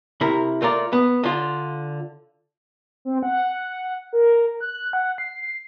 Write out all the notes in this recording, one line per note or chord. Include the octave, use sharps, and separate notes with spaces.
C3 E4 A#4
A3 F4 A#4 D5
B3
D3 F4
C4
F#5
A#4
F#6
F#5
C7